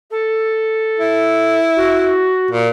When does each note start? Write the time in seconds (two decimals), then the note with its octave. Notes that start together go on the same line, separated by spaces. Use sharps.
0.10 A4
1.00 E4
1.76 F#4
2.51 A#2